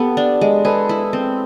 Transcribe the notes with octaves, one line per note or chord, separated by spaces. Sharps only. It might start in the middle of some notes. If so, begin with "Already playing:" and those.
Already playing: B3 G4 A4
D4
G#3
G#4 A4 B4
E4
C4